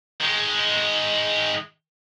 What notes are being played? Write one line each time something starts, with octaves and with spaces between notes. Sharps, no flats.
D#3 G#3